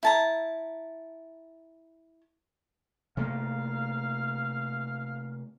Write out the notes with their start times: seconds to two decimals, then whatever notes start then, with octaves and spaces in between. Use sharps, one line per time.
0.03 E4 A5 A#5
3.17 C3 A3 A#3 F5